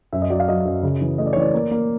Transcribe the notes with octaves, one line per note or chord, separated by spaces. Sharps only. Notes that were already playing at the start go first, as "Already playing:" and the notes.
F#2 E5
D#5
F#3 D5
F5
F#3 D#5
F#2
C#3
E3
A3 D#5
D5
C#5
E3 D5
A#3
A#3